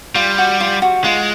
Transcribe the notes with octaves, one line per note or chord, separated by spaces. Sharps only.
G3 F4
F#4
F4
F#4
G#3 F4